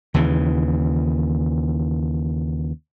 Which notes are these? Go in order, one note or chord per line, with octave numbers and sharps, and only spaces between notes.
D#2 C#3 E3